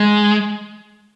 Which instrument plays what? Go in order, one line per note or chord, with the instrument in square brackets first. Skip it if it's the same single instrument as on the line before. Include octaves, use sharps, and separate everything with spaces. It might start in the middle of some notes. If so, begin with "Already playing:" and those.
Already playing: [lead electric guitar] G#3